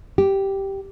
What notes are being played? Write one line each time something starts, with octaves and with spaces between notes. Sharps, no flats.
G4